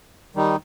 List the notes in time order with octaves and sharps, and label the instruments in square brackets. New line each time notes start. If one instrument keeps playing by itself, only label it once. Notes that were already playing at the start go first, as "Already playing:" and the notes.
[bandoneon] D#3 G3 D#4